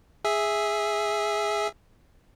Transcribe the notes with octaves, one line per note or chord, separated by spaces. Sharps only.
G#4 E5